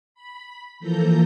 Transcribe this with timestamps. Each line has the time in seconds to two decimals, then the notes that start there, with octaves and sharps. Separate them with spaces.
0.14 B5
0.80 E3 F3 A#3 A4 A#5 G6